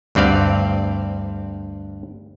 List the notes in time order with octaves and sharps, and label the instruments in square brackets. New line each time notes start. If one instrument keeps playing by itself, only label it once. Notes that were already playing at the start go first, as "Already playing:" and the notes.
[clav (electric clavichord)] D2 G2 C4 D5 F5